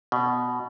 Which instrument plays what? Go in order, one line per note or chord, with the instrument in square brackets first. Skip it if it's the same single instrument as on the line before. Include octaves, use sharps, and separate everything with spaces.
[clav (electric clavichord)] B2